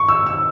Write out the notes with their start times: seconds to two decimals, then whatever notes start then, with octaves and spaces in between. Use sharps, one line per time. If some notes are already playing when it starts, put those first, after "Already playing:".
Already playing: C#6
0.09 E6
0.26 E6